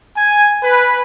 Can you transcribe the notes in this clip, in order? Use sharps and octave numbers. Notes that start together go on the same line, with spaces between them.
G#5
B4